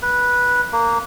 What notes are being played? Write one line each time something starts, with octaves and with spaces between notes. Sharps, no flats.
B4
A#3